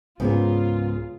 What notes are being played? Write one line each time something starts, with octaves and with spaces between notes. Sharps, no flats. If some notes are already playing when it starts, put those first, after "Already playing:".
C#2 G#2 A#3 B3 C#4 F4 G#4